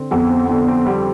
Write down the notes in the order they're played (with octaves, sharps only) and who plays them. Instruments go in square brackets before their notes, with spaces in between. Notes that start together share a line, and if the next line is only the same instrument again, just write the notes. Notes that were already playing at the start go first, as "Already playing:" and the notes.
Already playing: [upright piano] D3 C4
[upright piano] F2 [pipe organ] B3
[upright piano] C4
[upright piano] D3 [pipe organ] B3
[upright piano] C4
G3